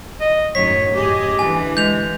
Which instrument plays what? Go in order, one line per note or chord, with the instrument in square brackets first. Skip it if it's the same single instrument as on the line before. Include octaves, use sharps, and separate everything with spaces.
[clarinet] D#5
[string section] F#2 A2 D#3 [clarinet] C#5 [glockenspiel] B6
[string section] F#2 G#4 D#5 [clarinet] G4
[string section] D3 E3 [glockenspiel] G#5
[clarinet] G#3 [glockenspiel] G6 F7